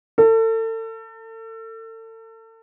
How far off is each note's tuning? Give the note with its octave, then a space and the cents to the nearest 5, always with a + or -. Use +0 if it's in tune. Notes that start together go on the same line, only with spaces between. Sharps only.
A4 +35